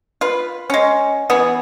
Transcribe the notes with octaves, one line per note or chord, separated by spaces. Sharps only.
F4 B4
G#3 C#4
E3 B3 G#4